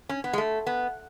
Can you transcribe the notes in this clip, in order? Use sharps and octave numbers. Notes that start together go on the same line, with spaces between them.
C#4
B3
G#3
A3
B3